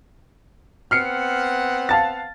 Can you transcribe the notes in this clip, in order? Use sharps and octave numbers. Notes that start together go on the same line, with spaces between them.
B3 C4 F#5 F6 C7 C#7
F5 A5 A6